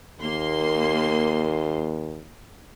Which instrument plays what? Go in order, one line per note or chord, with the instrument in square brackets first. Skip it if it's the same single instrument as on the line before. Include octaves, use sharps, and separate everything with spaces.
[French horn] D#2 [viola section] A#3 C6